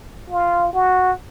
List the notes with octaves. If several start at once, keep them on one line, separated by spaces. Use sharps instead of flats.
F4
F#4